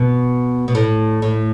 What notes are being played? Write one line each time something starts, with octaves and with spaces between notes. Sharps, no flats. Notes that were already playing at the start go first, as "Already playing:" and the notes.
Already playing: B2
B2
A2
A2